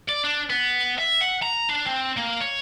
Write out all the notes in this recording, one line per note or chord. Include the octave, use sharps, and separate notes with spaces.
D5
D4
B3
E5
F#5
A#5
D4
C4
A#3
C#5